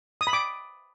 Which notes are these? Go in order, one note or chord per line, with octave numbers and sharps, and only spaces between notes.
D#6
B5
D6